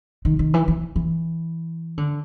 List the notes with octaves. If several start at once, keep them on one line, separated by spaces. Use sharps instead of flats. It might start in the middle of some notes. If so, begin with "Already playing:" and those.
D#3
D#3
E3
E3
E3
D3